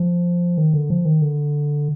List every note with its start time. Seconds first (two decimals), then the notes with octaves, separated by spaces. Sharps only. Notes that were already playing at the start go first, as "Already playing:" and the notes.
Already playing: F3
0.58 D#3
0.73 D3
0.90 F3
1.05 D#3
1.22 D3